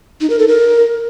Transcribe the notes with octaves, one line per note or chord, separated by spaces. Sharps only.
D#4
A#4
A4
A#4